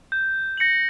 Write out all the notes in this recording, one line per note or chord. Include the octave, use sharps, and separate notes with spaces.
G6
A#6 C#7 F#7